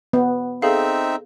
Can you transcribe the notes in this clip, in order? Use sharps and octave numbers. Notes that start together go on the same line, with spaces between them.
B3
C4 D#4 G#4 A4 E5 F5